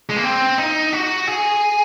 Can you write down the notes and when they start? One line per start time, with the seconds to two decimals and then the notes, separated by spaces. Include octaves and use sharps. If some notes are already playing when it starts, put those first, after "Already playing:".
0.09 G#3
0.16 A#3
0.23 C4
0.58 D#4
0.93 F#4
1.27 G#4